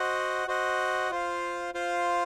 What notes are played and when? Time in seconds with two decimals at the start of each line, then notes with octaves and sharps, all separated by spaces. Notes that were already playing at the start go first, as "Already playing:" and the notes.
Already playing: F#4 C5 D#5 F#5
0.47 F#4 C5 D#5 F#5
1.11 F4 C5 F5
1.74 F4 C5 F5